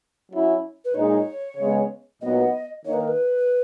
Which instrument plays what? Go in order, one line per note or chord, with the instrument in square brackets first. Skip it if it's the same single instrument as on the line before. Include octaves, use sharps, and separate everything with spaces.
[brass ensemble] F#3 C#4 E4
[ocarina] B4
[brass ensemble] A#2 G#3 D#4 [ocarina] C#5
[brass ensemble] C#3 G#3 B3
[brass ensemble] A#2 F#3 B3 D#4 [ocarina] D#5
[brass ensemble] D#3 A#3 D#4 [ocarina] C#5
[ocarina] B4
A#4
B4